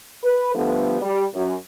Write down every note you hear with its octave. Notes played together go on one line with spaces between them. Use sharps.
B4
D3 F3 G3 A3 B3
G3
F#2